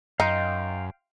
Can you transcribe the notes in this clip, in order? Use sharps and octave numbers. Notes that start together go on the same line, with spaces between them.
F#2 D#4 F5 G5 C6